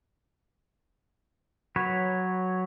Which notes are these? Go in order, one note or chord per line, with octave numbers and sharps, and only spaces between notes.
F#3 B4 C#5